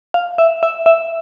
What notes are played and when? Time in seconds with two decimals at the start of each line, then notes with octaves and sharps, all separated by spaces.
0.14 F5
0.38 E5
0.63 E5
0.86 E5